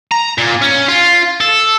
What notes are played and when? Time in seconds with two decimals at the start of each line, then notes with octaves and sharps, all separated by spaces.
0.11 A#5
0.38 A#2
0.62 C#4
0.88 F4
1.40 A4